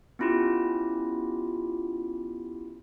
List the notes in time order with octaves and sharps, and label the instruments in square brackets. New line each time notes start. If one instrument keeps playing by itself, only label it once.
[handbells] B3 C#4 E4 F4 G4